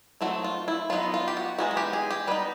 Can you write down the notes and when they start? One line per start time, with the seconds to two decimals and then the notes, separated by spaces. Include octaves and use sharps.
0.21 F#3 A3 C4 D#4 F#4
0.44 F4
0.68 E4
0.90 F#3 B3 D#4 F4
1.14 F4
1.28 G4
1.37 F#4
1.58 E3 G#3 B3 D#4 F#4
1.71 F#4
1.77 G4
1.93 G#4
2.11 G4
2.27 G3 B3 D#4 B4